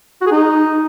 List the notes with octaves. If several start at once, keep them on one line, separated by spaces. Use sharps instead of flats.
F#4
G#4
D#4